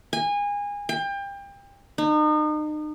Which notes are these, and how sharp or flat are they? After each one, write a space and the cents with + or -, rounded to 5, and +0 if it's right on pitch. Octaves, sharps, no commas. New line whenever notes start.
G#5 -25
G5 +30
D#4 -35